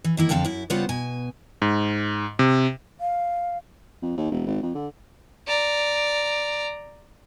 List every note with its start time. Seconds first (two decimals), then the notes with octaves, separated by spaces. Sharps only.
0.04 E3
0.17 D#3 A#3 E4
0.29 F2 D3 A#3 F5 G5 A5
0.45 F#2 E4
0.70 C#3 G3 B3 F4 C5 F#5
0.89 B2 G#5
1.62 G#2
2.39 C3
3.00 F5
4.02 F2
4.18 D#2
4.32 E1
4.46 G#1
4.63 F2
4.75 D3
5.48 D5 A#5